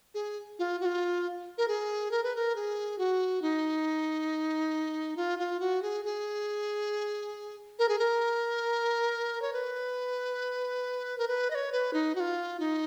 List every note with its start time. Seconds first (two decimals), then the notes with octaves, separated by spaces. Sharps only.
0.14 G#4
0.59 F4
0.81 F#4
0.85 F4
1.58 A#4
1.68 G#4
2.11 A#4
2.24 B4
2.36 A#4
2.56 G#4
2.98 F#4
3.42 D#4
5.17 F4
5.39 F4
5.60 F#4
5.82 G#4
6.05 G#4
7.79 A#4
7.89 G#4
7.99 A#4
9.42 C#5
9.53 B4
11.18 A#4
11.28 B4
11.50 D#5
11.55 C#5
11.72 B4
11.93 D#4
12.15 F#4
12.20 F4
12.60 D#4